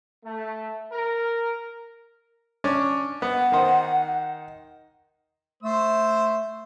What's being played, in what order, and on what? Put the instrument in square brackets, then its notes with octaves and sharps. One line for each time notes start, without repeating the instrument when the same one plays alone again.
[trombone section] A3
A#4
[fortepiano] C#4 D4 C#5
[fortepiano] B3 [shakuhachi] F#5
[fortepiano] D#3 D#4 C5
[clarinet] A3 [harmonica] C5 E6